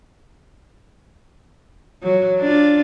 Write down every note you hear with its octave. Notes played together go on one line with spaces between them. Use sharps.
F#3
D4 F4